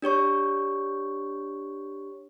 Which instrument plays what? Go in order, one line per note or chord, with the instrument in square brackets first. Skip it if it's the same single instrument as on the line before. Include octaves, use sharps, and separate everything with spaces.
[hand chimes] D4 G4 C#5 C#6